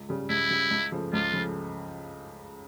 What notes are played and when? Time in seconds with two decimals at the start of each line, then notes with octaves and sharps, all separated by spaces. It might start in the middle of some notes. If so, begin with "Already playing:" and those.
Already playing: C#2
0.09 C#3 G3
0.29 C#2 E4
0.50 C#3 G3
0.71 C#2
0.92 C#3 F3 A3
1.13 C#2 F4
1.33 C#3 F3 A3